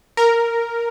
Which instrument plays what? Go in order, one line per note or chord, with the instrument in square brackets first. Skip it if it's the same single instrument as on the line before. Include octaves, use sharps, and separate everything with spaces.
[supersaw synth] A#4